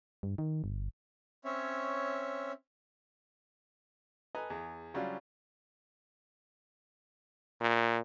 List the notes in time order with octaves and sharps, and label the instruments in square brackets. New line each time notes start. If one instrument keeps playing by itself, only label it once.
[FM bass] G2
D#3
G1
[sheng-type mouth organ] C4 C#4 C#5 E5
[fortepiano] A4 B4 D#5 G#5 A#5
E2 G#4
C#3 F#3 G3 C#4 D4 F4
[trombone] A#2